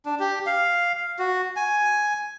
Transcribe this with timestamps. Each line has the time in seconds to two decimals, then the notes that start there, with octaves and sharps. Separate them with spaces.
0.06 D4
0.20 G4
0.46 F5
1.19 F#4
1.56 G#5